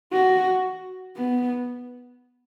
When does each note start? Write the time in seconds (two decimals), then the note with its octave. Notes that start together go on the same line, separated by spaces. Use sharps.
0.13 F#4
1.17 B3